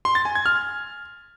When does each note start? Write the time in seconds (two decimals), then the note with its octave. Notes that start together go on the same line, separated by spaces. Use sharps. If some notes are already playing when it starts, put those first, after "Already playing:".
0.05 C6
0.15 A6
0.25 G#5
0.35 G#6
0.46 F6